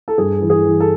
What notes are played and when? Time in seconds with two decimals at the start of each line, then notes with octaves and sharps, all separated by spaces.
0.08 A4
0.18 G2 G#4
0.42 E3
0.50 G#4
0.65 E3
0.80 A4